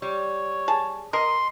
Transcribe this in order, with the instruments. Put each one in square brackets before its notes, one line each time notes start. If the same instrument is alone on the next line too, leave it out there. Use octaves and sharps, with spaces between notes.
[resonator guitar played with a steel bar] G3 [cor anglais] C#5
[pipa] G#4 A5
[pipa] A#4 [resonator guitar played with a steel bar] D#5 [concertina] C6